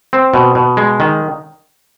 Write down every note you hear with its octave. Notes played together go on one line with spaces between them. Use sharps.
C4
B2
B2
G#3
D#3